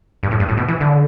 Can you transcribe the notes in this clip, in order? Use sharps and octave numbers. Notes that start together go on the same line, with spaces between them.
G2
A2
G2
A2
B2
E3
D3